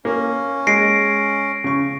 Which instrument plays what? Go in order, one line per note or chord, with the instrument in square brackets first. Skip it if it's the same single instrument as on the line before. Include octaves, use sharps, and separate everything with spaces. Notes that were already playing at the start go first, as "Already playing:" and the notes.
[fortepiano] A#3 [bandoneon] C#4
[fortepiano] G#3 [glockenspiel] A#6 C7 D7
[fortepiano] C#3 C#6